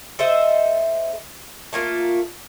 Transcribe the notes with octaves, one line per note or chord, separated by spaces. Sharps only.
A4 C5 D#5 E5
A3 A#3 F4 A#4